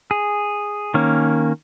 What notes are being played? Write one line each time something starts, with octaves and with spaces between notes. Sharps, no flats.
G#4
D#3 A#3 C#4